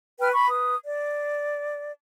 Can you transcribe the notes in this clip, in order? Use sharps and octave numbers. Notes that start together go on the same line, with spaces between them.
B4 G5 F6
B5 C#6
B4 D#6
D5